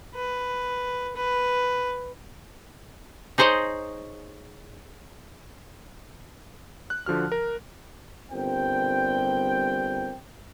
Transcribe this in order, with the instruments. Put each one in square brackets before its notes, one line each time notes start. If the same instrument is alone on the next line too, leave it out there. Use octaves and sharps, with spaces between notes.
[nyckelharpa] B4
B4
[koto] D#4 G#4 C5 C#5 D#5
[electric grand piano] F#6
D3 F3 F#4 F6
A#4
[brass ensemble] G1 G3 C4 A#4 G5